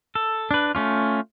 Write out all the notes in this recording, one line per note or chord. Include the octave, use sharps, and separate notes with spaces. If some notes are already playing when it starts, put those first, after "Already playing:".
A4
D4 B4
A3 C#4 F4